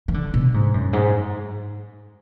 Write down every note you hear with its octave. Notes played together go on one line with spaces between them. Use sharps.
E3
D3
B2
G#2
F#2
G#2